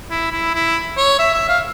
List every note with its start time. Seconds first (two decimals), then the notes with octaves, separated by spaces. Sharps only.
0.11 E4
0.31 E4
0.54 E4
0.97 C#5
1.19 E5
1.34 E5
1.48 F5